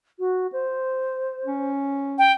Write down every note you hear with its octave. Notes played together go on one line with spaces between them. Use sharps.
F#4
C5
C#4
G5